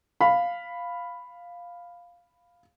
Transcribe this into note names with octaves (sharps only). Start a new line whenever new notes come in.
F5 B5